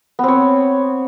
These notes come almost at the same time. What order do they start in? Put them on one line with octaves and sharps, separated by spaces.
B3 C4 C#5